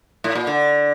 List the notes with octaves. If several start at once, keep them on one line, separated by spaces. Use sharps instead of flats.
A2
A#2
D3